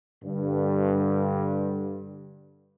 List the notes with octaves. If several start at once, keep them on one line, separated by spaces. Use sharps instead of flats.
G2 D3